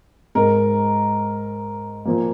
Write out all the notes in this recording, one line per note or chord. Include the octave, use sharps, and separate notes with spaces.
G#2 G#3 A#4
A#2 F3 A#3